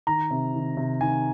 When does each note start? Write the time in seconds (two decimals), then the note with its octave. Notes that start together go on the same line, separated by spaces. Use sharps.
0.07 D#3 A#5
0.31 C3
0.54 D#3
0.77 C3
1.01 D#3 G#5